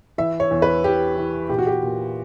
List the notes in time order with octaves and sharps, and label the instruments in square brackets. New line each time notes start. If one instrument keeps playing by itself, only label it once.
[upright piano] E3 E5
C#5
E2
B4
E3 G4
E3
A#2 G4
F#4
G4
A#2